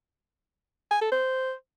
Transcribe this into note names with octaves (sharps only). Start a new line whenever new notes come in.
G#5
A4
C5